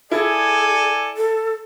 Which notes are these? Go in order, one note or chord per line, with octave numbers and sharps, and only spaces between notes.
E4 G#4 A4 D5 G#5
A4